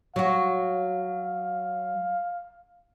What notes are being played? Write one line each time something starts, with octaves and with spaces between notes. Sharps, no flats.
F#3 F#4 F5